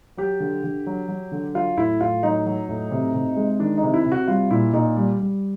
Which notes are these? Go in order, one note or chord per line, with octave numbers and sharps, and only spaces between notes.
F#3 G4
D3
D3
F#3
F#3
D3
F#3 F4
A2 E4
A2 F4
F#3 D#4
F#3
A2
C3
C3
G#3
D#3 D4
D#4
C3
E4
C3
F#4
G3 F4
A#2 E4
A#2 D#4
G3
G3